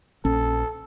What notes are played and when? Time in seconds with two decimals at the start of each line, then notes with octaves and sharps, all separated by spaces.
0.25 A#1 C#4 A4